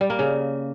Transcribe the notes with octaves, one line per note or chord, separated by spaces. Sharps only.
G3
A#3
C#3